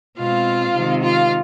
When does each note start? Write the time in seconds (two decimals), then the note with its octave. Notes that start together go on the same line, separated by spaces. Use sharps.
0.18 B2 G#3 C4 F4 F5
0.75 C3 D#3 G#3 C4
1.03 F4 F5